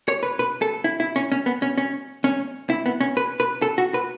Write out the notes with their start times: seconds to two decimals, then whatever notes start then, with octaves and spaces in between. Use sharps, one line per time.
0.08 C#5
0.23 B4
0.39 B4
0.62 A4
0.84 E4
1.00 E4
1.16 C#4
1.32 C#4
1.46 B3
1.62 C#4
1.78 C#4
2.24 C#4
2.70 E4
2.86 B3
3.01 C#4
3.17 B4
3.40 B4
3.62 A4
3.78 F#4
3.94 B4